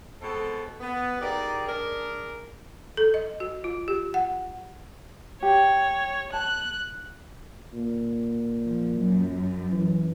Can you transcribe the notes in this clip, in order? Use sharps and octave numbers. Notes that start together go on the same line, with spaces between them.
B2 G#3 C4 A4
B3
D#4 G4 G#4 A#4 D5
D4 G#4 A#4
A4
D#5
F#4
F4
G4
F#5
G4 C#5
A5 F#6
A#2
F3
F#2
E3